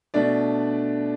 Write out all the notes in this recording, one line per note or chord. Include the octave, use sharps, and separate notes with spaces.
B2 A3 D4 D5